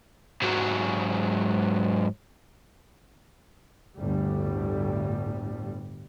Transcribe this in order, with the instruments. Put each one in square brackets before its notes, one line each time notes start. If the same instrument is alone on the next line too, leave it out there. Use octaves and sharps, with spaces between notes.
[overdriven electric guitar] G#2 F#3
[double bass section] G1 D2 A2 G3